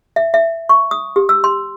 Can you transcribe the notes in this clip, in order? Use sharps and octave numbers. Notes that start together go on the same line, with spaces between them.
E5
E5
C#6
D#6
G4
E6
C6